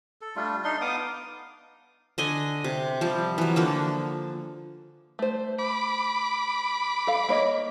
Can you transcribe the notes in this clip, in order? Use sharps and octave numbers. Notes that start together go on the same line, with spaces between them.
A4
G3 A3 D4 F4
D4 D#4 C6
B3 F5 D6 D#6
D3 D#5 G#5
C3
F3 G3
E3 F#3
D3 F3 A#3
A3 C5
B5 D6
A4 F5
A#3 C#5 D#5